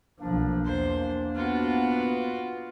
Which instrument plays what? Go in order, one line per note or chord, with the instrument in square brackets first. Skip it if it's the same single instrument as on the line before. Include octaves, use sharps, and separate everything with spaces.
[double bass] B1 F3 [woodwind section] A#3 D4
[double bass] E2 [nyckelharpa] C5
[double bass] B3 [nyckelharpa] F4 F#4